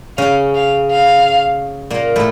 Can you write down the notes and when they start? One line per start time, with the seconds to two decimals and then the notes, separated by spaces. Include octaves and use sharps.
0.17 C#3 C#4 F5
0.55 F5
0.92 F5
1.90 A#2 A#3
2.16 A2 A3